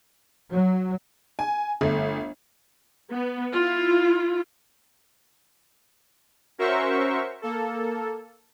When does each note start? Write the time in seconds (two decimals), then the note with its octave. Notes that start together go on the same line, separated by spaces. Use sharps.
0.52 F#3
1.39 G#5
1.81 G1 A3
3.09 B3
3.53 E4 F4
6.58 C#4 F#4 A#4 C5 E5 C#6
7.42 A#3 A4